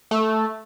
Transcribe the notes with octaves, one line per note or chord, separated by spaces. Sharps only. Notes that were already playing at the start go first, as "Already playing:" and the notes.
A3